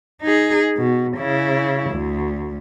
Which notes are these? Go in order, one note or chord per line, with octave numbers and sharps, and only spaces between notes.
D#4 G#4
B2
C#3 E4
D2